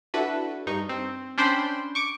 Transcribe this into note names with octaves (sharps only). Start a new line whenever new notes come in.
D4 E4 F#4 A4 B4
G2 D#4 C#6
C4
C#4 D4 C5 G5 B5 C6
C#6 D6 D7